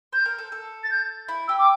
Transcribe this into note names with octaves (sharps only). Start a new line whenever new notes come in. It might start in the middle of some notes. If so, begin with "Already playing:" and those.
C5 G6
A#4
A4
A4
A6
G6
E4
G4 E6
D6